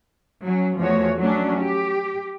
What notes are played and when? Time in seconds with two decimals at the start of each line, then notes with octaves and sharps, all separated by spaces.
0.45 F#3 C#4
0.79 E2 F3 A3 F#4 C#5
1.19 F#3 A3 C#4 D4
1.61 G4